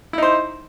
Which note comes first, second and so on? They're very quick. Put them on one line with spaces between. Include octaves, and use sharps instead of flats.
E4 D#4 C5